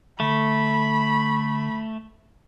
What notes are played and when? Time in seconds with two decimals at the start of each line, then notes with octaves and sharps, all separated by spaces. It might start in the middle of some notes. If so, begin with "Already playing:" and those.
0.20 D3 A3 B5